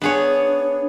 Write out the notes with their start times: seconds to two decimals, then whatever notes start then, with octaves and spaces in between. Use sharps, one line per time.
0.01 B3 D4 G#4 C#5